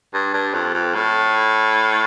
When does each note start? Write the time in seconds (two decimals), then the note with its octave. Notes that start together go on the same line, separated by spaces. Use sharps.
0.14 G2
0.34 G2
0.53 F2
0.74 F2
0.94 A2